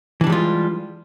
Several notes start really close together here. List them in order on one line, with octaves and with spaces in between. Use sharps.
E3 D4 G3 G#3 F4